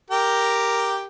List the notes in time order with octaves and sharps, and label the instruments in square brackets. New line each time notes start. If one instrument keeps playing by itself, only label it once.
[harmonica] G4 A#4 G5